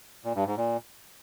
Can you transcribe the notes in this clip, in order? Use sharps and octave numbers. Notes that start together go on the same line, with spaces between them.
A#2
G2
G#2
A#2